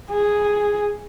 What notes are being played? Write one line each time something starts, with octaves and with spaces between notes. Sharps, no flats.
G#4